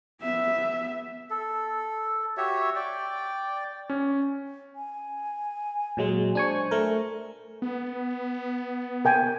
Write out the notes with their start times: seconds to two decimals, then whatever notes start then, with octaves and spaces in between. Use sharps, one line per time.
0.22 B3 E5
1.30 A4
2.37 F#4 G4 C#5 E5
2.75 D5 G5
3.90 C#4
4.76 G#5
5.97 A#2 F#3 G#3
6.35 D4 C5 G#5 C#6
6.71 A3 A#4
7.62 B3
9.05 A#4 G5 G#5